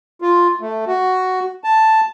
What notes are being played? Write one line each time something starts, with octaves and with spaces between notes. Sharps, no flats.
F4
A3
F#4
A5